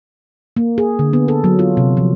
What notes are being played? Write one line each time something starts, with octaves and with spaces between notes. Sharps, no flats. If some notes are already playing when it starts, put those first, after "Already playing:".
A#3
G#4
D3
B3
A4
F#3
F4
C3
F3